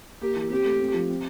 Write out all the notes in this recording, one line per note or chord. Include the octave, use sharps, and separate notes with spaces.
A#3 G4
E3
C4 G4
A3
C4
F3
C4